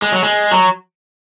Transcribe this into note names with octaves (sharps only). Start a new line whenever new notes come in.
G#3
F#3
G#3
F#3